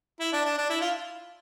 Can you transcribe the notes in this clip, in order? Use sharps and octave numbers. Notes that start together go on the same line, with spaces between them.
E4
D4
D4
D4
E4
F4